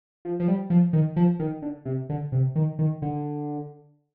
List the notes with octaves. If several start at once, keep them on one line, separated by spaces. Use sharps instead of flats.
F3
F3
G3
F3
D#3
F3
D#3
D3
C3
D3
C3
D#3
D#3
D3